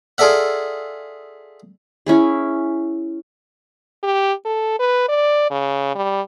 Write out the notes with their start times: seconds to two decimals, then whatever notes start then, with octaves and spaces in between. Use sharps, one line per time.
0.18 F4 G#4 A4 D5 E5 F#5
2.06 C#4 E4 G#4
4.03 G4
4.45 A4
4.79 B4
5.09 D5
5.51 C#3
5.95 G3